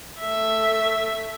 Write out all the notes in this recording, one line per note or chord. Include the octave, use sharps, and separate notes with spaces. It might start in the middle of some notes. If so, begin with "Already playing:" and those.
A3 E5